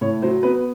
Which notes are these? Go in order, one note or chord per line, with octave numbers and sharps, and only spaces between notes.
A2 C#5
F#3 C5
B3 B4